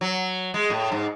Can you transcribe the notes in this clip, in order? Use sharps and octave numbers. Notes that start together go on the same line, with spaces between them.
F#3
G#3
A2
G#2